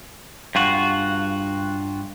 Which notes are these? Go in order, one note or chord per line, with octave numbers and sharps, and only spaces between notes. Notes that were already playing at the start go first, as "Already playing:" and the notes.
G2 F4 F#4